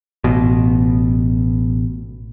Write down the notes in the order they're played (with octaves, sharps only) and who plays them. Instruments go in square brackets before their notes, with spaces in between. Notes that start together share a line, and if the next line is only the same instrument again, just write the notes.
[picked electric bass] A1 B2